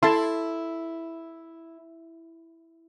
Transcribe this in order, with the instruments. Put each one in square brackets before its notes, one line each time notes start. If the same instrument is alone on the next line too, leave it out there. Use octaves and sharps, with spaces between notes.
[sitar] E4 [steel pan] A4 A5 C6